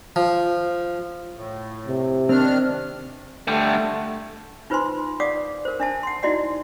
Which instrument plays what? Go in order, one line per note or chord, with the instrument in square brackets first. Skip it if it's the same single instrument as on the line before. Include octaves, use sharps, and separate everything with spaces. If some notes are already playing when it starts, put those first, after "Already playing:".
[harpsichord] F3
[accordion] A2
[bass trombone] C3
[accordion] D#3 D4 F6 [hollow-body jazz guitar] C4
[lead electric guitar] D3 G3 [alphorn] A3
[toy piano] D#4 F4 B4 C5 G#5 C6
D5 F5 F#5 D6 D#6
A#4 C5
D4 E5 A5
F#5 C6
D#4 E4 F#4 D5 D#5 F#5